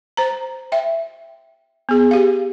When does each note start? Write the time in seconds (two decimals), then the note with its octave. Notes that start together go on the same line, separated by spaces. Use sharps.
0.17 C5 A#5
0.72 E5 G5
1.89 B3 G#4
2.11 G4 F5